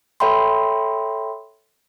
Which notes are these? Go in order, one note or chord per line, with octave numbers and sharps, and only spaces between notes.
A4 C#5 E5 G5 B5 C6